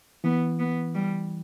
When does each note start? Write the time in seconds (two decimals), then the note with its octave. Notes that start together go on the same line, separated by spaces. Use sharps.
0.24 E3 B3
0.59 B3
0.95 G3